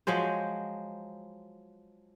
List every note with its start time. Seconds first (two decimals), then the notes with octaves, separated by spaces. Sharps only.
0.07 F3 F#3 G#3 C5